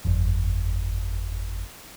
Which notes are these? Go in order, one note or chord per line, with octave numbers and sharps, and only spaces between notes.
G1 F2